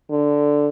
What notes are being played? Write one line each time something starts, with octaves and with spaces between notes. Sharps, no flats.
D3